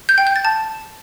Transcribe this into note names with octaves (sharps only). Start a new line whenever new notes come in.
G6
G5
G6
A6
A5